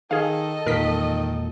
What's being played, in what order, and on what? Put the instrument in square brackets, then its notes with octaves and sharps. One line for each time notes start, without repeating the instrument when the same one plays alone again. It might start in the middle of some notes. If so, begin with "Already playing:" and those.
[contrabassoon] D#3 [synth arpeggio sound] G#4 F5 [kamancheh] A4 D#5
[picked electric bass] E1 A#2 [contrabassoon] D#3 [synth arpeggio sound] A#4 B6